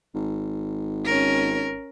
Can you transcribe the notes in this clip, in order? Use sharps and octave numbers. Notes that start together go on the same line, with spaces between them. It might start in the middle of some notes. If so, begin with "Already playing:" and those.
G#1
C#4 A#4